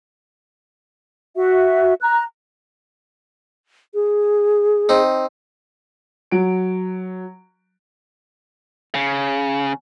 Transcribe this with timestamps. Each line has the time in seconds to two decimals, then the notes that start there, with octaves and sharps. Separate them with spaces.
1.36 F#4 E5
2.02 A#5 F#6
3.94 G#4
4.89 C4 D#4
6.31 F#3 D7
8.95 C#3